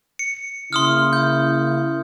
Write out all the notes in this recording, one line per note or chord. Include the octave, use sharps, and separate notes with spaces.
C#7
C#3 A#3 E4 C6 D#6 F6
G6